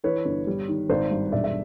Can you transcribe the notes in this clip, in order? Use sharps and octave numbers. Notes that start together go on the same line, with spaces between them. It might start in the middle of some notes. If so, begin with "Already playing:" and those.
E3 B4 C#5
G1
G3
D#3
G#1 C5 D5
G2
E1 D5 E5
E5